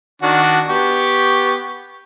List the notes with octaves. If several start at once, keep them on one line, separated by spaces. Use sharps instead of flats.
D#3 D4 F#4
B3 G4 C#6